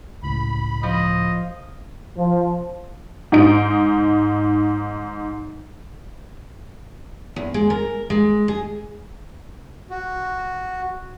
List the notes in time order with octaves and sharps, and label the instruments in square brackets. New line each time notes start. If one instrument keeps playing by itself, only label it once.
[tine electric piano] C#2 A2 C#3 [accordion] B5
[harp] F3 [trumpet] D#5
[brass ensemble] F3
[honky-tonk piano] G#2 D#4 D7
[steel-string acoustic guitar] E2
G#3
A#4
G#3
G#4
[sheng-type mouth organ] F#4